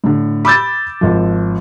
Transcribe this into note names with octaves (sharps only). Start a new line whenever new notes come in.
A2 D3
B5 D6 E6 G6 A6
G#1 F3